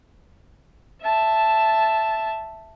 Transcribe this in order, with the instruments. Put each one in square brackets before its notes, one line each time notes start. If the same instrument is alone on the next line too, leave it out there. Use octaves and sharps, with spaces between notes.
[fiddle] E5 A5